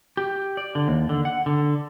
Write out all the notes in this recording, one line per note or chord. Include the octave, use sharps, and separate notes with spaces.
G4
D5
D3
D#2
D3
F#5
D3